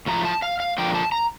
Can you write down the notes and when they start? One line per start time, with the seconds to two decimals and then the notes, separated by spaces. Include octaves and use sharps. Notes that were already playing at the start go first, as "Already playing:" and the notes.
0.06 A2 F3 A3 A#5
0.25 A5
0.42 F5
0.60 F5
0.78 D3 F3 A#3 G5
0.95 A5
1.12 A#5